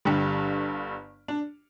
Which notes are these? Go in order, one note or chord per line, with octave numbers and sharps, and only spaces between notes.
G1 G2 D3 G3
D4